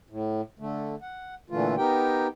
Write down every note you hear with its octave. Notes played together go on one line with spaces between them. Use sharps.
A2
D3 A3
F#5
A#2 D3 E3 A3 F4
B3 D#4 G4 A#4 G5